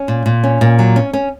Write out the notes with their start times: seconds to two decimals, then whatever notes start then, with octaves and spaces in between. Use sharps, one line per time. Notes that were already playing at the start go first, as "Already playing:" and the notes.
Already playing: C#4
0.08 A#2
0.26 A#2
0.43 C#4
0.61 A#2
0.79 F#3
0.96 C#4
1.13 C#4